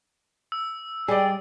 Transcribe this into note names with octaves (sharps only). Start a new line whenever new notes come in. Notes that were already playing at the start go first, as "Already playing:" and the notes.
E6
G3 G#4 D5 D#5